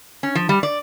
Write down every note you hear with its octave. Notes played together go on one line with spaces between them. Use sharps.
C#4
F3
G3
D5